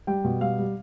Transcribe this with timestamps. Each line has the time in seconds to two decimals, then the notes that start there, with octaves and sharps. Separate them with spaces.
0.07 G3 G5
0.25 B2
0.41 G3 F5
0.59 G3